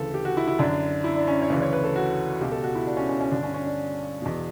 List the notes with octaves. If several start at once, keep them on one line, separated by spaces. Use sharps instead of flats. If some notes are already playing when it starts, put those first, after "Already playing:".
Already playing: D2 C#3 E3 A4
G4
F#4
E4
E4
F#2 D3 D4
E4
D4
C#4
C#5
D2 C#3 E3 D5
C#5
B4
A4
F#4
C#2 B2 G4
A4
F#4
E4
D4
C#4
C#4
C#4
G2 D3 D4
C#4
C#4
D4
E2 B2